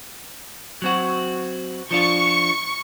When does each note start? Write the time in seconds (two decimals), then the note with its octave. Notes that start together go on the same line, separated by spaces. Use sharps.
0.82 F#3 C4 F#4
1.91 F3 D4 F4 C#6